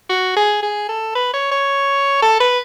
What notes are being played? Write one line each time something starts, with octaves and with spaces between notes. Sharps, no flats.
F#4
G#4
G#4
A4
B4
C#5
C#5
A4
B4